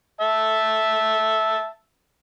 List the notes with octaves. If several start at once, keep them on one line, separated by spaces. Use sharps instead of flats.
E5 A5